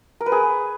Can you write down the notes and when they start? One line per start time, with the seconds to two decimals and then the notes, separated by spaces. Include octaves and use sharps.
0.21 A#4
0.26 B4
0.32 G#4